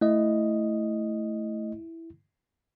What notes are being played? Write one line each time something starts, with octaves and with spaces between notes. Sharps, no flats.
A3 E4 D#5